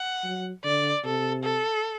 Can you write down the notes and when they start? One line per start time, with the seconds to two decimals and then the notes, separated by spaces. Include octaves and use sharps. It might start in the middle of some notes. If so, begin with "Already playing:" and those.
Already playing: F#5
0.24 F#3
0.64 D3 D5
1.04 C3 A4
1.44 A4